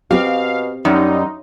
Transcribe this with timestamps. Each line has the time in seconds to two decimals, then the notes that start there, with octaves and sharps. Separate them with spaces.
0.11 B2 C4 G4 F5
0.85 F#2 G3 D#4